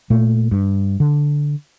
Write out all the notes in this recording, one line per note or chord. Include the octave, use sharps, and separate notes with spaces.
A#2 A3
G2
D3